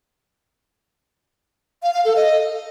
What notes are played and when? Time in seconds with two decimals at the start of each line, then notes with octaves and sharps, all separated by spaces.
1.83 F5
1.94 F5
2.05 A4
2.16 D#5